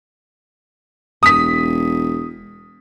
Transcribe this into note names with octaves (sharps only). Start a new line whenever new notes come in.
E1 D#6 B6